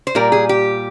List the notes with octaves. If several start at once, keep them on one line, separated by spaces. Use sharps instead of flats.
C5
A#2 G3 A#4
G#4
G4